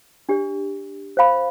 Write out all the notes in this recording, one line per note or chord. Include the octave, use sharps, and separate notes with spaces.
D4 G4 D5
C5 F5 B5